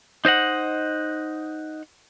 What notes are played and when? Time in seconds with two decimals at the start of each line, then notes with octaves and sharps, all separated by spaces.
0.25 D#4 C5 D#5 F#5